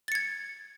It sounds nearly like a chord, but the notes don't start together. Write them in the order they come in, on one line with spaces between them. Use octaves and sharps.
A6 C#7 G#6